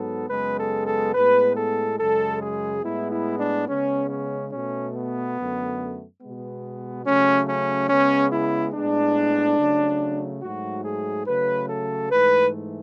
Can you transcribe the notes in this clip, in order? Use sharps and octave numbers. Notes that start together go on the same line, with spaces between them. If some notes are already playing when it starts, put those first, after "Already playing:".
Already playing: G#2 F#3 B3 A4
F#2 C#3 G#3 B3 B4
A4
A4
A2 G#3 B3 B4
A4
F#2 C#3 G#3 A4
G#4
A2 G#3 B3 E4
E4
D4
C#3 G#3 B3 C#4
C#4
B2 A3 C#4
B3
F#2 D3 A3
B2 G#3 B3
C#3 F#3 A3 C#4
C#4
C#3 G#3 B3 C#4
E4
A2 G#3 B3 D4
C#3 F#3 A3
G#2 F#3 A3 F#4
G#4
C#3 F#3 A3 B4
A4
G#2 E3 A3 B4